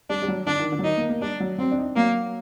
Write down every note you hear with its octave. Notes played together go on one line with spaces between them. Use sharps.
G3 D4
G3
F#3
D3 D4
D#3
D3
F#3
D#3 D#4
A#3
A#3
G3 D4
F#3
F#3 C4
D4
D#4
D4
F#3 A#3